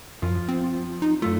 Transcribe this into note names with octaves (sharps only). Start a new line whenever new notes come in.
F#2 F3
C4
D#4
F#2 A3 F4